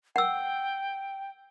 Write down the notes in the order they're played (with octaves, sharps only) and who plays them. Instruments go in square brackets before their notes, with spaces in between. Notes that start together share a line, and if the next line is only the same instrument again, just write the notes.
[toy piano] F#5 E6 [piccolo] G5